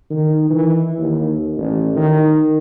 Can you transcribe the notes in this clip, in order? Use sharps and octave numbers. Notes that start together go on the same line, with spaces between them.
D#3
E3
D#2
A1
D#3